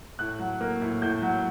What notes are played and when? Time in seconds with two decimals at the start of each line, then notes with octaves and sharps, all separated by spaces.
0.19 A2 F#6
0.39 F#3
0.61 A#3
0.81 A2
1.02 A2 G6
1.22 F#3